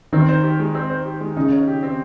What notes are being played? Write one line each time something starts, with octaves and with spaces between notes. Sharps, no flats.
D#3 C4
C5
G4
G#3
C4
C5
G4
G#3
C#3 D#4
C#5
G4
C4